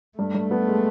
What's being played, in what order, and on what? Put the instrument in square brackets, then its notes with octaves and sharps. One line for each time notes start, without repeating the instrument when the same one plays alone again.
[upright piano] G2 [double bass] A3
[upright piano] G2
B3
G#3